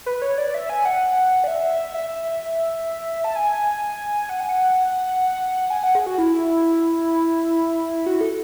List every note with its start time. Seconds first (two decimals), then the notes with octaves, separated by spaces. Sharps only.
0.06 B4
0.22 C#5
0.38 D5
0.54 E5
0.70 G#5
0.85 F#5
1.44 D5
1.48 E5
1.94 E5
3.24 A5
3.35 G#5
4.29 F#5
4.40 G#5
4.49 F#5
5.70 G#5
5.83 F#5
5.95 G#4
6.06 F#4
6.18 E4
8.06 F#4
8.21 A4